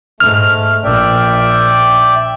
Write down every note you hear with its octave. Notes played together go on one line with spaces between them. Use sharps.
G#2 A3 F6
A#1 D5 E5 G5